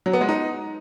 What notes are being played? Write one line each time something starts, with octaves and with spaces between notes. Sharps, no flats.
F#3
B3
G#3
D#4